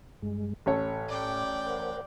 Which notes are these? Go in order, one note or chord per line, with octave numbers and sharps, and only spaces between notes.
G2 G#3
A1 A2 A4 C#5
D5 G5
A#4 C5 F#5